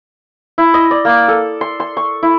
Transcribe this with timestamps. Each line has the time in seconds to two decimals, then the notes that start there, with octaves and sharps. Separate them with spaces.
0.58 E4
0.74 D#5
0.91 D5
1.05 A#3
1.28 A4
1.61 C6
1.80 C6
1.97 C#6
2.23 E4